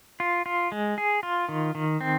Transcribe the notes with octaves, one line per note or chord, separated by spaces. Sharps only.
F4
F4
G#3
G#4
F4
D#3
D#3
C4